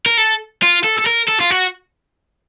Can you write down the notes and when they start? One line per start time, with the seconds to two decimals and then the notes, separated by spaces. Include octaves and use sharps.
0.06 A#4
0.18 A4
0.62 F4
0.84 A4
0.99 A4
1.06 A#4
1.29 A4
1.41 F4
1.51 F#4